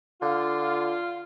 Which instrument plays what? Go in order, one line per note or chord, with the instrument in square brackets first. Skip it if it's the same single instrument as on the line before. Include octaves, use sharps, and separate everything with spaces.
[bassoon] D3 [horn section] F4